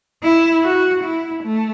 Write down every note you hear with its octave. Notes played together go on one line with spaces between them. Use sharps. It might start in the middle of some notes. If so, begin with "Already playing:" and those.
E4
F#4
E4
A3